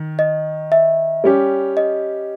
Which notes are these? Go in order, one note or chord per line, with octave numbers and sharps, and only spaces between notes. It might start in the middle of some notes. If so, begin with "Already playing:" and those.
Already playing: D#3
D#5
E5
G3 C#4 G4
D#5